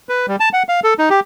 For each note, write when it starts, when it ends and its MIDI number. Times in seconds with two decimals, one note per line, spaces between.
0.09 0.26 71
0.28 0.36 55
0.40 0.49 81
0.53 0.63 78
0.69 0.80 77
0.84 0.94 69
0.99 1.09 63
1.10 1.20 67